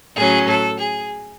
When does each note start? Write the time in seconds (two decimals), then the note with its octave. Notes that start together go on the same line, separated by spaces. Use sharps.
0.17 A2 F#3 C#4 G#4
0.49 A4
0.79 G#4